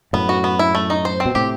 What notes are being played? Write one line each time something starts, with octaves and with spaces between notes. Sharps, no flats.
F#2 A2 B3
F#4
B3
E4
A3
D#4
C5
C4
B2
A2 C3 G4